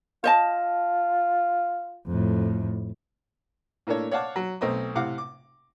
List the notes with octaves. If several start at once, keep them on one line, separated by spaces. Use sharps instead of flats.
F4 C5 D#5 A5
F2 A2
A2 A#3 D4 A4 C#5
C#5 D5 F5 F#5 A5 D6
F#3
B1 A3 C4 D#5 A#5 D#6
A2 C3 F5 F#5 D6
D6